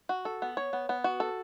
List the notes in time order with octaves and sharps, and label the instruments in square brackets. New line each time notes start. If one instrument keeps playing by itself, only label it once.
[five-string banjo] F#4
A4
B3
C#5
B3
B3
F#4
A4